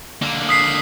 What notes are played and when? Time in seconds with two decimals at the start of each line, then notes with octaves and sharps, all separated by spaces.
0.22 D3 A#3
0.49 D#6 B6 C7